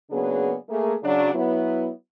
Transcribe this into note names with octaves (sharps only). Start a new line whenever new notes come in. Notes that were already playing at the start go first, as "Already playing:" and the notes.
C#3 F#3 A#3 B3 D4 G#4
A3 A#3 G#4
C#3 F#3 D4
F#3 B3 E4